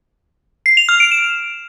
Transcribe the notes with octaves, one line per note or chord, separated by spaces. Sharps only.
C7
F7
F6
D7
E7